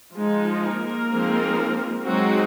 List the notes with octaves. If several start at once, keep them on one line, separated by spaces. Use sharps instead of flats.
F3 G#3 D#4
A#3 A#4
F3 G#3 C4 D#4
F#3 G#3 C4 D#4 F#4